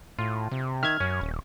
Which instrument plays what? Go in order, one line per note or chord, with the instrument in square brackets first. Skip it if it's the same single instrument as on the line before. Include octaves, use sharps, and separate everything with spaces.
[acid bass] A2 [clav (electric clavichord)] F4
[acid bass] C3
[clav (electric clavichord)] D#3 E5 [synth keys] F6 G#6
[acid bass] F#2 [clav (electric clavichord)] C#4
[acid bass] D#1